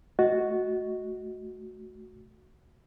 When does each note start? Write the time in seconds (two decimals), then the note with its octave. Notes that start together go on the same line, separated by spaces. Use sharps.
0.19 A3 F#4 D#5